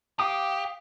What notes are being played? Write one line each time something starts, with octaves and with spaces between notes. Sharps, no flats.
G4 F5 D6 D#6